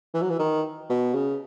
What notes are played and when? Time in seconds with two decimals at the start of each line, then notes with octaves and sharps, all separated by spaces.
0.14 E3
0.22 F#3
0.30 E3
0.39 D#3
0.89 B2
1.14 C#3